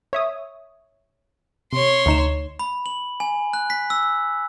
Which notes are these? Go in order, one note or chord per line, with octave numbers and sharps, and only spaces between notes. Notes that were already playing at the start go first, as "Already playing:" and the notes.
C#5 E5 D#6
C3 C#5 C6
D2 D#4 E7
B5
F#7
G#5
F#6
B6
E6